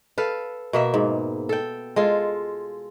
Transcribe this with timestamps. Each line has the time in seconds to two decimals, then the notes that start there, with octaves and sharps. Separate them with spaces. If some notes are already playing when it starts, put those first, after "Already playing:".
0.18 A4 B4 F5
0.73 B2 A#3 E5
0.94 G#2
1.49 A4 G5
1.96 G#3 F4 A4